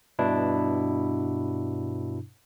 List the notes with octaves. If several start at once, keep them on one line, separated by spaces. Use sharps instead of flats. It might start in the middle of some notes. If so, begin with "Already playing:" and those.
G2 B2 D4 E4